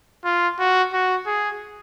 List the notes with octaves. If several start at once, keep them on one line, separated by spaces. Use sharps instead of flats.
F4
F#4
F#4
G#4